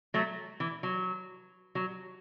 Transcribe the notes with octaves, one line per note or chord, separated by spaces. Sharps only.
F#3 A3
E3
F#3
F#3